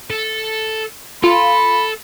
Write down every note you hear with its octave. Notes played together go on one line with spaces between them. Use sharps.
A4
F4 A4 B5